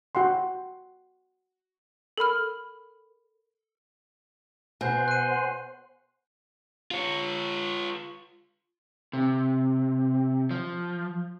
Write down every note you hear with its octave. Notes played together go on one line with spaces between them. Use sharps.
F#4 F#5 G5 C6
A4 A#4 B5 F6
B2 C5 F#5 G#5 C6 G6
F#6 D#7
F4 C#5
C3
F3